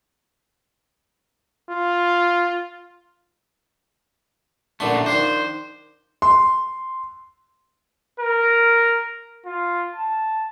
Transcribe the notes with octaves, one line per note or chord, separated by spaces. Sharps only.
F4
A#1 F#2 A2 D3 A3 C6
D#3 F3 D4 C5
C6
A#4
F4
A5